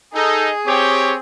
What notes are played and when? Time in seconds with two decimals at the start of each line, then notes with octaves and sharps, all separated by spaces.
0.15 D#4 G#4 A4
0.67 C4 G4 C#5